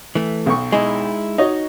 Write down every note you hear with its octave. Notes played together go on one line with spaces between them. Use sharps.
E3 A3
B1 C#6
G#3 D#4 E4
D#4 F#4 C#5 D#5